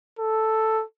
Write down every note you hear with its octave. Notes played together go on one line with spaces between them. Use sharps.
A4